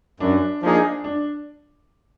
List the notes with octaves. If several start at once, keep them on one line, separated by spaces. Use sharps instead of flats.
F#2 D4
F3 A#3 D4 D#4 G#4
D4